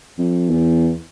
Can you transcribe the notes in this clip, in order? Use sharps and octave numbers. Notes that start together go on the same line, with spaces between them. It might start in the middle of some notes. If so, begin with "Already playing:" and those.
F2
E2